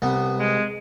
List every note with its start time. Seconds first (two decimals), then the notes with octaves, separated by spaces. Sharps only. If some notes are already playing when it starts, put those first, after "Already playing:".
0.02 C2 B3
0.37 G#3